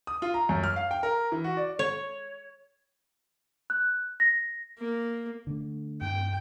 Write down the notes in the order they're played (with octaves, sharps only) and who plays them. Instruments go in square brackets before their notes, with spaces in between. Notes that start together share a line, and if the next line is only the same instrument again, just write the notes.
[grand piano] D#6
F4
A#5
F#2
F6
F5
G5
A#4
E3
F#4
D5
[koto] C#5
[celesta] F#6
A#6
[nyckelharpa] A#3
[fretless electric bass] D3 A3
[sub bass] G2 [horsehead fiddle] G5